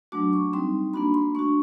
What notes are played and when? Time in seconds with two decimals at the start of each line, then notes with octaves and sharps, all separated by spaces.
0.12 F#3 A3 D4 F#4 D6
0.33 C#6
0.53 G3 C4 D#4 C6
0.94 A#3 D4 F#4 B5
1.14 C6
1.35 A3 D4 F#4 C#6